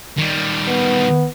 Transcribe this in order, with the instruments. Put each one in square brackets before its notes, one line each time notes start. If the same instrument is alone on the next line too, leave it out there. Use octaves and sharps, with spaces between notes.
[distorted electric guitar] D#3 G3
[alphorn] B3